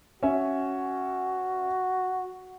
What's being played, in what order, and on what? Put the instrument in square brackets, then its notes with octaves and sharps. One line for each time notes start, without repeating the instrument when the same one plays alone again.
[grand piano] C#4 E5 G#5 [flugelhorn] F#4